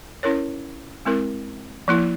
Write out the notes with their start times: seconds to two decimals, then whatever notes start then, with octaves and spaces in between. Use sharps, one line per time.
0.23 C#4 E4 A#4 C#5
1.05 G#3 C4 E4 A#4
1.88 F3 A#3 E4